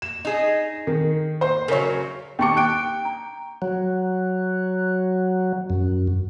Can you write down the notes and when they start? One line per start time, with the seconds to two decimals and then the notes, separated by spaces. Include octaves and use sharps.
0.02 E7
0.25 D#4 G#4
0.87 D#3
1.41 C5 C6
1.68 C#3 F#3 A#4 C#5
2.39 D#2 G5 A5 C#6 D6 C#7
2.57 G5 F#6 D7
3.05 A#5
3.62 F#3
5.70 F#2